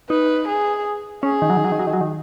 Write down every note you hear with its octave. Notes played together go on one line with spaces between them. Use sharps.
D#4 B4
G#4
C#4 G#4
D#3
F#3
D#3
F#3
D#3
F#3
D#3
F#3
D#3